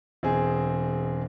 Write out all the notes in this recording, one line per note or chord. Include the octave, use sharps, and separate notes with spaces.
E1 C4 G#4